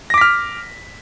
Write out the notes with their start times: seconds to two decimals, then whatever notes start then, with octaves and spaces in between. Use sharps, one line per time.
0.10 A#6
0.14 D6
0.18 B6
0.21 F6